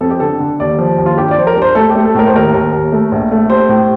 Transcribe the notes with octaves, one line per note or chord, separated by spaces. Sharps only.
F2 A4
G4
D3 A4
D3
D#2 D5
F3
D#2
F4
G2 G4
D5
F3 C5
A#4
G2
C5
A3 A4
G4
A3
A4
A2 A#4
C5
D#2 A#4
D#2
D#2
A3
A#1
A3
G3 C5
A2